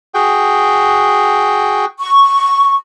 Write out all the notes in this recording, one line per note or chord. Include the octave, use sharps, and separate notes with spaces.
F#4 G#4 G5
C#6